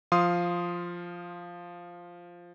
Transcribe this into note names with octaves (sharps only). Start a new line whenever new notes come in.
F3 F5 C6 D#6